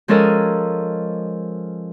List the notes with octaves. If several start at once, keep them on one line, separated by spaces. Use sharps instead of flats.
F3 G#3 C#4 A4 A#4 D#5